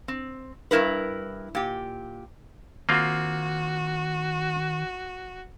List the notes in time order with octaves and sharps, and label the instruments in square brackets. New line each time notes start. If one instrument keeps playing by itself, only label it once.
[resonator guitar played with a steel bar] C4
G2 G3 E4 A#4 B4
A#2 G4
[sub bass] D#3 [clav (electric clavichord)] A#3 C4 F4 [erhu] F#4